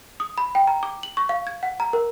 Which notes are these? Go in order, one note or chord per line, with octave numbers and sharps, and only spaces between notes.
D#6
B5
G5
A#5
D6
F#7
C#6
F5
G#6
F#5
A#5
A#4